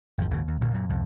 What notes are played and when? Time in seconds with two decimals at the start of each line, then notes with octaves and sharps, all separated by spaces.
0.18 G#1 F2 D#3 F3
0.30 G#1 D#2 A#2 C#3
0.48 D#2
0.61 A1 G2 A#2 D3
0.74 F#2 A#2
0.89 C2 F2 G#2 B2